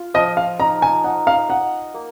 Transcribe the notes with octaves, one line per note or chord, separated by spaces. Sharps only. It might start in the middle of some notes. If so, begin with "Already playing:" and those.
Already playing: F4
F3 D#5
F5
D#4 A#5
G#5
D#4 F#5
F5
D#5 F#5
A#3